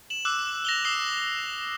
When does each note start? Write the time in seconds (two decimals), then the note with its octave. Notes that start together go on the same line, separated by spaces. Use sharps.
0.10 E7 F#7
0.25 D6 E6 F#6
0.65 A#6 F7 G7
0.85 D#6 E6 C7 E7 G7